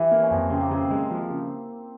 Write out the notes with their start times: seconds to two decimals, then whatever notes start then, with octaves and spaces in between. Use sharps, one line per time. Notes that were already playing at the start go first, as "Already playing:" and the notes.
Already playing: E3 E4 G4
0.11 A#3
0.21 C#4
0.31 F2
0.50 C#3 C4
0.61 A#3
0.70 C#3 C4
0.90 G#3
1.11 F3
1.30 C#3